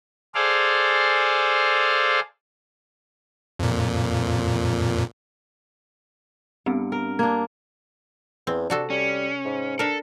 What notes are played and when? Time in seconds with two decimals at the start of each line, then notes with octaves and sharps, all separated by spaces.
0.35 G#4 A4 C5 D5 F5
3.59 F2 A#2
6.66 G2 B3 C4
6.92 A#4
7.19 A#3 D4 G#6
8.47 E2 C4
8.70 C3 D4 F#4 A4
8.90 G3 C#4
9.45 G#2
9.79 D4 A4 A#4